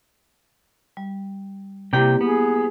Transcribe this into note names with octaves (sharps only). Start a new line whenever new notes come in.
G3
C3 A#3 E4 G4 D5 G5
B3 G#4